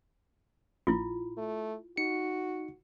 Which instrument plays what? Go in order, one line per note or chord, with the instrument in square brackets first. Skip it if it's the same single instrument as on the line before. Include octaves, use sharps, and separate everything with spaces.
[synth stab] A#1 [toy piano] E4 F4
[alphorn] A3
[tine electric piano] D#4 C#7 [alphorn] F#4